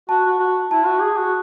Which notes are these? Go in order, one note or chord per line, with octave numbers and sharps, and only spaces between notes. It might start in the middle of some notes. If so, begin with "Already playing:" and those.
F#4 A5
F#4
F#4
E4 A5
F#4
G#4
F#4